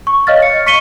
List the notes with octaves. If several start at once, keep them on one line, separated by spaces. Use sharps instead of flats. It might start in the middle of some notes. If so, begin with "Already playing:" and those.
C#6
C#5 D#5 F5 F6 A6
C#7
C#6 B6 C#7 D#7 G7